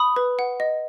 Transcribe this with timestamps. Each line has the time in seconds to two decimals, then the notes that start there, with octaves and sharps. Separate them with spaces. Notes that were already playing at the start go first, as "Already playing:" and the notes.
Already playing: B5 D#6
0.16 B4
0.39 F#5
0.60 D#5